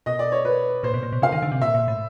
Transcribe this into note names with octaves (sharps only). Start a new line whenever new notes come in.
B2 D#5
D5
C#5
B4
A#2 C5
B2
A#2
B2
C#3 F5
D#3
D3
C3
A#2 E5
A#2
A2